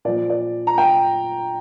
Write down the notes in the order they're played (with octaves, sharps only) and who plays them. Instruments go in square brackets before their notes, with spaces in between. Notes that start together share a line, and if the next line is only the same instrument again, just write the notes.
[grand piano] A#2 F3 D5
D5
A#5
G5